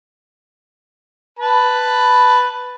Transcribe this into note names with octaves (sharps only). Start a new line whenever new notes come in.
B4 A5 B5